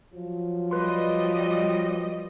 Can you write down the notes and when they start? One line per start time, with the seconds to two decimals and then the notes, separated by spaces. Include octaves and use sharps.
0.13 F3 F#3
0.71 G3 B4 D#5 C6